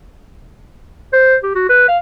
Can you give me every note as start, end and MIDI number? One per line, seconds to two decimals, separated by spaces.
1.13 1.36 72
1.43 1.51 67
1.55 1.64 66
1.69 1.87 71
1.88 1.98 77